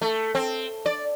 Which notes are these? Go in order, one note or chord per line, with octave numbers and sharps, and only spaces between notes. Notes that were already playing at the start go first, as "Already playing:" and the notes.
A3
C4
D5